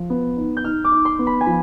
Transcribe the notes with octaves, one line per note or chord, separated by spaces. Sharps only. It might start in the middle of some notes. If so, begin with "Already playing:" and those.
Already playing: F3
B3
D#4
G6
D#4 F6
D6
D#4
C6
B3
B5
G#5
F3 B5